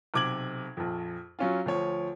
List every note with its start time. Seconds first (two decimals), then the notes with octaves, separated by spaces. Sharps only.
0.14 B1 C3 D6 G#6 F#7
0.77 A#1 F2
1.39 F#3 C#4 F4
1.65 D2 F3 C#5